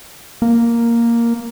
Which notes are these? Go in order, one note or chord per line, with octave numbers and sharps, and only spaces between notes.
A#3